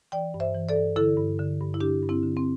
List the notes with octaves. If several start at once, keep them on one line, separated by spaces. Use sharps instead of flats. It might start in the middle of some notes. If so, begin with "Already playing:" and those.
E3 D5 G5
G2
C5 E5
E3
A4 D5
G2
D3 E4 A4
G2
D3
G2
E4
D3 D4 G4
G2
C4 E4
D3
C4